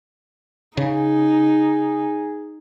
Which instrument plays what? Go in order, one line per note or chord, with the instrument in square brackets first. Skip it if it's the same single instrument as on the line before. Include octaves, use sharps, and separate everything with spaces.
[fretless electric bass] C#3 [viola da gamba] D#4 [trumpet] G#4